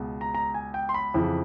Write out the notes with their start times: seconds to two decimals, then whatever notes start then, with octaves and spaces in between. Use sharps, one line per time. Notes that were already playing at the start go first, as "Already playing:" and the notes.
Already playing: C#2 B2
0.21 A#5
0.34 A#5
0.54 G#5
0.74 G5
0.89 C6
0.94 B5
1.14 F2 C#3 E3